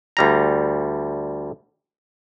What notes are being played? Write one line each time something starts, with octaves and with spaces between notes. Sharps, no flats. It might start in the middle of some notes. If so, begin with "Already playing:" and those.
D2 G3 A#5